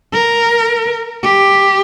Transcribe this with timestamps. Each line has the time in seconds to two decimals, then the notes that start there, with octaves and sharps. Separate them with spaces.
0.13 A#4
1.24 G4